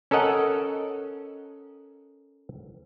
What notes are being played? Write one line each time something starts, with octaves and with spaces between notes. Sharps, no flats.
C#4 A4 A#4 D#5 F#5